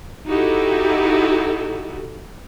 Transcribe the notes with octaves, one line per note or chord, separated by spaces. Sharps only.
D#4 E4 F#4 G4 A4